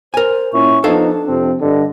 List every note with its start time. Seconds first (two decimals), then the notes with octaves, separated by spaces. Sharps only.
0.14 A#4 C5 G#5
0.53 A#2 C#4 E4 C#6
0.84 F3 B3 D4 D#4 A4 C5 F5
1.27 F2 C3 C4
1.61 G2 D3 D#5